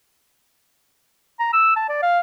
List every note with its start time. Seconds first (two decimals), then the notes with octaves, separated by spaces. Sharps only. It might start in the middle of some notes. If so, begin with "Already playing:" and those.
1.39 A#5
1.53 E6
1.76 A5
1.89 D5
2.02 F5